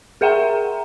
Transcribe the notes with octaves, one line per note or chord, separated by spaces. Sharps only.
G#4 A#4 E5 F#5 G5 A#5